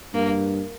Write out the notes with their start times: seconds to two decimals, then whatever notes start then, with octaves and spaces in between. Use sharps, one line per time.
0.14 G2 A#3